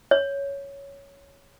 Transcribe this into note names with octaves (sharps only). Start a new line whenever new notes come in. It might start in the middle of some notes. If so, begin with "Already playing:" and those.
C#5